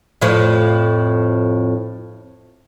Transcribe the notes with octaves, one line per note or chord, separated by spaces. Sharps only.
F2 A2 F3